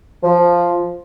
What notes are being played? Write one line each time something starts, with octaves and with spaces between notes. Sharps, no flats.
F3